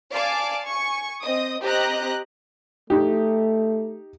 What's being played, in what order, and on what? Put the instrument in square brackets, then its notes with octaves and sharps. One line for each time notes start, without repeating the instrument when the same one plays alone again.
[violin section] D5 F5 G#5 A5 D6
G#5 C#6
C4 D#5 D#6
C4 G4 D#5 A#5 F#6
[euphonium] A3 [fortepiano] D#4 G4